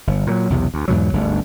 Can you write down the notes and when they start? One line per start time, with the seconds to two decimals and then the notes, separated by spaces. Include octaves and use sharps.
0.07 G1
0.27 A#2 D#3 F#3
0.50 B1 E2 C3
0.74 D2
0.88 E2 G#2 B2 F#3
1.13 G1 D2 G#2